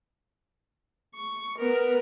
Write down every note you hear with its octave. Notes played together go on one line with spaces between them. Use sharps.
C#6
B3 A#4